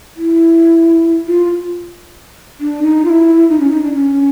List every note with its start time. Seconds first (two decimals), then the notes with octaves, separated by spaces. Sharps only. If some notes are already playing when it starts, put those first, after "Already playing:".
0.16 E4
1.27 F4
2.60 D4
2.83 D#4
3.05 F4
3.10 E4
3.49 D#4
3.60 C#4
3.71 D#4
3.82 D4
3.93 C#4